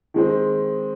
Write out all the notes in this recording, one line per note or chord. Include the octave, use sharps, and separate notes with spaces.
D#3 G#3 C4